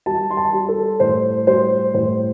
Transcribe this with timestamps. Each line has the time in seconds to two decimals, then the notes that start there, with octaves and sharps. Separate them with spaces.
0.06 G3 A5
0.30 C6
0.37 A5
0.53 G3
0.69 A4
1.00 A2 C5
1.47 G3 C5
1.94 A2 C5